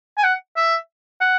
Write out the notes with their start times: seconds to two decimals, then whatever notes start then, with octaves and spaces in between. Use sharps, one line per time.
0.17 G#5
0.24 F#5
0.56 E5
1.21 F#5